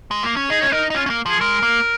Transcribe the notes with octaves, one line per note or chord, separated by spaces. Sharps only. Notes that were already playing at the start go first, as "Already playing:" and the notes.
G#3
A#3
C#4
D#4 G#4
C#4 C#5
D#4 A#4
D#4
C#4 F4
C#4
A#3
F3 G#4
G#3 A#4
A#3